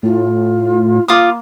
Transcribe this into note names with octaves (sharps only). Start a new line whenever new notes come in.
A2 F4
A#3 F4 D6 D#6